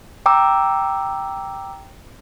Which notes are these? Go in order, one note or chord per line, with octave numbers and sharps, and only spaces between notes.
G5 A#5 D6 E6